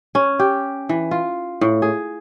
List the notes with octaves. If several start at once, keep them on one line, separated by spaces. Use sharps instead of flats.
C#4
G4
E3
F4
A2
G#4